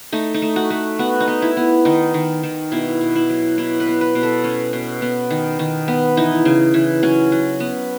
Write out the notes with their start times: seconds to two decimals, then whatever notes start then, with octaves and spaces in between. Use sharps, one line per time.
0.12 A3 D#4
0.34 D#4
0.42 A3
0.56 F#4
0.70 A3
0.99 B3 F#4
1.20 D#4
1.28 B3
1.42 E4
1.57 B3
1.85 D#3 D#4
2.14 D#3
2.43 D#3
2.72 B2 E4
3.01 B2
3.15 E4
3.30 F#3
3.58 B2 E4
3.80 B4
3.87 B3
4.01 B4
4.15 B2
4.23 A4
4.44 B2 C#4
4.73 B2
5.02 B3
5.30 D#3
5.59 D#3
5.88 B3
6.17 E3 D#4
6.45 C#3
6.74 E3
7.03 F#3 C#4
7.32 F#3
7.60 B3